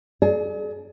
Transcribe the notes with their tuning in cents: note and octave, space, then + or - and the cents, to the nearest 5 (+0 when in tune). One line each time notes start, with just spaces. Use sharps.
G#4 +40 D5 +20